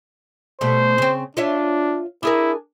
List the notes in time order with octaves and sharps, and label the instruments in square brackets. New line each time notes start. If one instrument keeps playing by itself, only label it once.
[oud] B2 G3 A3 [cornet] C5
[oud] C#3 C4
[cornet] D4 [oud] F4 C#5 E5
[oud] D4 G#4 A#4 [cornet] E4